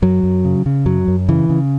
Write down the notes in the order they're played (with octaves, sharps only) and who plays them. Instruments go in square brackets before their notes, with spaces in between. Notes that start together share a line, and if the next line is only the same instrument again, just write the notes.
[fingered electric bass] F#2 F#3
F#2
C#3
C#3
F#2 F#3
F#2
C#3 E3
C#3